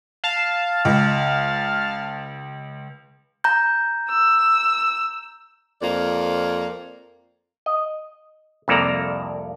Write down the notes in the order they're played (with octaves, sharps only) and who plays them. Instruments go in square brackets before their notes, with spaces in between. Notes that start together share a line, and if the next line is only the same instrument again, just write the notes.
[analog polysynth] F5 A5
[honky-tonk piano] C#2
[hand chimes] A#5 G6
[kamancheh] E6
[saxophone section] F2 A#3 A#4 D5
[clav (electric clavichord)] D#5
C2 F2 A#3 A4 D5 A#5